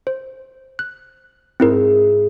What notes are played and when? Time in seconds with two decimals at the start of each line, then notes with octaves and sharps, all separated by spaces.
0.07 C5
0.79 F#6
1.60 G#2 C4 D#4 E4 A#4 E5